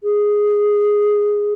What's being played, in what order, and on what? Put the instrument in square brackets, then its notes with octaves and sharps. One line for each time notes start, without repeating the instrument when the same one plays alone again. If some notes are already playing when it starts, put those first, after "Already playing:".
[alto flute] G#4